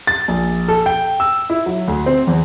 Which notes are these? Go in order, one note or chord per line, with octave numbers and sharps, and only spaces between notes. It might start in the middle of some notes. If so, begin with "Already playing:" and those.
A6
A#1
A4
G5
E6
E4
F#3
D2
C4
E2